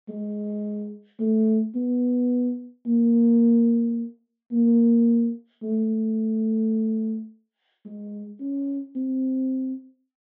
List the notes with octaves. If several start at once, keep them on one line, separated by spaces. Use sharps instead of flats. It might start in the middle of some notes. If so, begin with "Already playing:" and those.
G#3
A3
B3
A#3
A#3
A3
G#3
C#4
C4